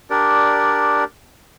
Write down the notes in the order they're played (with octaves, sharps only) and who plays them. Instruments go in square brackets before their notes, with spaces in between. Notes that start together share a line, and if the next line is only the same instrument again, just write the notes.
[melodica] D4 G4 A#4 D5